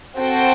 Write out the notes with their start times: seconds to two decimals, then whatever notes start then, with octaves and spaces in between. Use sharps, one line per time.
0.18 C4 F#4 A4 C5 G5